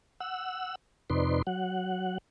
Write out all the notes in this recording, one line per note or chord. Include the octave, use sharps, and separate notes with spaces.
F#5 E6
F2 C3 D#4 B4 D5 C6
F#3 F#5